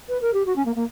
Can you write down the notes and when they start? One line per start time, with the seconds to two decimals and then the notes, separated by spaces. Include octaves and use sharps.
0.09 B4
0.22 A#4
0.33 G4
0.46 F#4
0.56 C#4
0.66 A#3
0.76 A#3